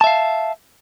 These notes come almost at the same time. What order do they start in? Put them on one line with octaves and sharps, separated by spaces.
A5 E5 F5